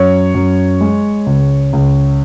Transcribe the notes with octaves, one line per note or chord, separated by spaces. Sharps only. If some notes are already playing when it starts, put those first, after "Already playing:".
Already playing: F#2 C#5
F#2
G#3
C#2
C#2